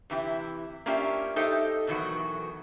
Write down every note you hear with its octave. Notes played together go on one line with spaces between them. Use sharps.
C3 E3 E4 G4
A#3 C#4 D4 F4 G4 E5
D#4 G4 A4 C5 D#5 E5
B2 D#3 E3 F#3 F#4